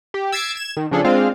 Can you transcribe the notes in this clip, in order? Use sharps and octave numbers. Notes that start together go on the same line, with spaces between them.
G4
E6 G#6 A6 B6 C7 D7
G#6 E7
D#3
C#3 F3 D4 G#4 A4
G#3 C4 D4 F4 F5